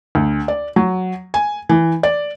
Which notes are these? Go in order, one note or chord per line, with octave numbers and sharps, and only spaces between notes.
D2
D5
F#3
G#5
E3
D5